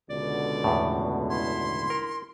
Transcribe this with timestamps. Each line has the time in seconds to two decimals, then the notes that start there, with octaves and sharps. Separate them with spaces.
0.10 C#2 B2 D3 D5
0.64 E2 A2
1.30 E4 C6
1.90 A#4